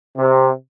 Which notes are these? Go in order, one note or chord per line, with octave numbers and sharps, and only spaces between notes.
C3